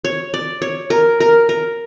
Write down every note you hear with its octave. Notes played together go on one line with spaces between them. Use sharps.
C#5
D5
C#5
A#4
A#4
A#4